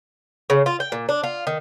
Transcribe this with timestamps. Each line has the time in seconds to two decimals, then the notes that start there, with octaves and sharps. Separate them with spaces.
0.50 C#3
0.66 F4
0.80 G5
0.92 A#2
1.09 D4
1.23 F4
1.47 D#3